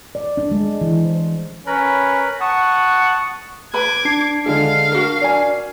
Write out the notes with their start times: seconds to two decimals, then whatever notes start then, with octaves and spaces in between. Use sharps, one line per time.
0.15 D5
0.37 D4
0.52 G#3
0.81 E3
1.05 C5
1.67 C#4 A#4 B4 B5
2.41 F#5 A5 C#6 D#6
3.74 B4 B5 D6 G#6
4.05 D4 A5 C7
4.46 D3 G#3 F5
4.92 F#4 A#4
5.22 D5 G#5